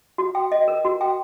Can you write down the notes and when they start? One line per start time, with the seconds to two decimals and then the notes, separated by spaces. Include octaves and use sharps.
0.18 F#4
0.35 G5
0.52 D#5
0.68 A#4
0.85 F#4
1.01 G5